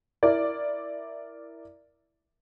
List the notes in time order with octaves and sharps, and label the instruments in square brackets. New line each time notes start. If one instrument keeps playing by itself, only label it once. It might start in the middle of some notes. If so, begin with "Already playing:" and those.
[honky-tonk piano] E4 A#4 D5